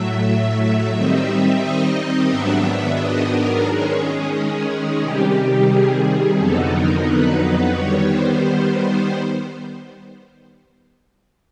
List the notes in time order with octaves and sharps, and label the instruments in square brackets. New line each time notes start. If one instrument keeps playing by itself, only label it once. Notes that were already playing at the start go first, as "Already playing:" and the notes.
Already playing: [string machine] A2 F#3 A3 E5
D#3 G3 C4 D#4
D#5
G#2 D#3 F#3 B3 D4 E5
E5
D#5
A#4
D#3 G#3 C#4 G#4
C3 D#3 G3 G4
G#4
F2 D3 F#3 B3 D#4 A4
A#4
B4
D#3 G3 B3 C#5
C5